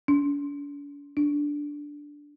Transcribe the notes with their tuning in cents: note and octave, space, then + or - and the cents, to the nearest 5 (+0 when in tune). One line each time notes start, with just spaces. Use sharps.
D4 -45
D4 -5